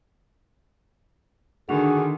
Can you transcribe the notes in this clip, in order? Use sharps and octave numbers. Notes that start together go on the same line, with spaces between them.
D3 D#3 D4 F#4 G#4